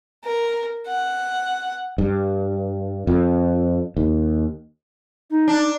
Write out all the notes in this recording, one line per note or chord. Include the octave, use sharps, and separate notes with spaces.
A#4
F#5
G2
F2
D#2
D#4
D4